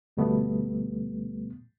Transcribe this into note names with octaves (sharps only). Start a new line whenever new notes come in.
D2 B2 G3 A3 B3